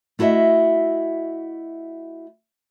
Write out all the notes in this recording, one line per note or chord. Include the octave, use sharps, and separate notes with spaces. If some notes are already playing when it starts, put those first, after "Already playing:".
A3 E4 F#4 D#5 E5